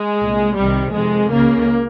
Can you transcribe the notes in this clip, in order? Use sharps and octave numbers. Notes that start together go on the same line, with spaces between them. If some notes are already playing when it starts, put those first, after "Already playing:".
Already playing: G#3
C2 A#2
C2 C3 D#3 G3
F2 C3 D#3 G#3
C#2 C#3 A#3